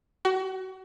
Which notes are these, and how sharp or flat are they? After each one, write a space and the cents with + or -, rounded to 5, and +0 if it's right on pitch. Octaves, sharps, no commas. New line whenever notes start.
F#4 +30